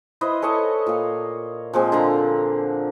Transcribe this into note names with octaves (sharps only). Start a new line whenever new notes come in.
E4 B4 C5 D#5
A4 C#5 D#5 A5
A#2 F5
A#2 F3 G#3 C4
D3 F5 A#5